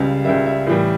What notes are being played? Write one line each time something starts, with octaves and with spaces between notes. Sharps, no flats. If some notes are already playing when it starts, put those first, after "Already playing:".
Already playing: C#2 C#3 G3
C#2 C#3 G3 E5
E5
A2 E3 G3